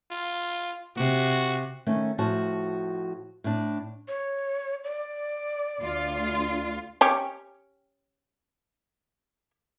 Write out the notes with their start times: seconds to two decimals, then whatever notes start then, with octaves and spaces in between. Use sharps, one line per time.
0.11 F4
0.97 C3 F#4
1.86 D#3 A3 C#4
2.18 A2 F3 F#4 A5
3.44 A2 D4
4.08 C#5
4.84 D5
5.81 D2 F4
7.01 C#4 G4